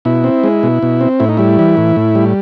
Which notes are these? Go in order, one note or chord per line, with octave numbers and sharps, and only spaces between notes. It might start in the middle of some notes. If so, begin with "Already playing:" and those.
B2 E4
C4
G#3
B2
B2
C4
A2 E4
D#4
G3 E4
E3
A2
A2
G3